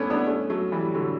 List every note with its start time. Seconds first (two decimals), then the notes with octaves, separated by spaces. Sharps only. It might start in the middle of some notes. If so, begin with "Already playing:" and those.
Already playing: A3 B3 C#4 D4 E4
0.10 B3 D4
0.27 A3 C#4
0.50 F#3 A3
0.72 E3 G3
0.95 D3 F#3